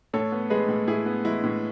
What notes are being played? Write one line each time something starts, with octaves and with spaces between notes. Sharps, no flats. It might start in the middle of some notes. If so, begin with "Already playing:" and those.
A2 A4 C#5
B3
G#3 G#4 B4
A2
A2 E4 G#4
B3
G#3 E4
A2